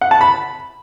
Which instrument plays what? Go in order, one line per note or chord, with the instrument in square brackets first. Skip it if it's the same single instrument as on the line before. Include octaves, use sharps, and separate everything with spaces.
[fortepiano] F#5
A5
B5